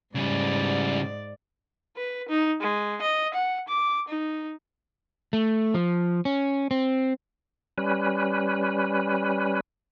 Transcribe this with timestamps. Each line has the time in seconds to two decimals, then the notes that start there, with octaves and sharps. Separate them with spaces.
0.15 G#2 C#3 G3 D5
1.97 B4
2.29 D#4
2.60 G#3
3.02 D#5
3.34 F#5
3.68 D6
4.08 D#4
5.33 A3
5.74 F3
6.25 C#4
6.71 C4
7.78 G3 C#4 B4